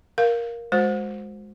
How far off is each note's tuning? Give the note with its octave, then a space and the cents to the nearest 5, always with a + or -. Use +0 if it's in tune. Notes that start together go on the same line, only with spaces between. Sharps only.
A#4 +10 F5 +0
G#3 +0 F#4 -25 C5 +0